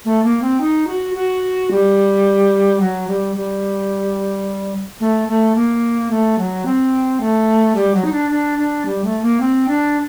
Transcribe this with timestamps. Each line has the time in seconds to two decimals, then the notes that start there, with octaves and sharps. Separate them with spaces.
0.05 A3
0.24 A#3
0.42 C4
0.61 D#4
0.87 F#4
1.15 F#4
1.71 G3
2.80 F#3
3.08 G3
3.36 G3
5.00 A3
5.28 A3
5.55 A#3
6.10 A3
6.38 F#3
6.65 C4
7.20 A3
7.75 G3
7.94 F#3
8.05 D#4
8.12 D4
8.31 D4
8.58 D4
8.85 G3
9.04 A3
9.22 A#3
9.40 C4
9.68 D4